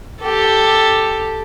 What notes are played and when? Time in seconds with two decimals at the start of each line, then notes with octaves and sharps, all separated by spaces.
0.21 G4 A4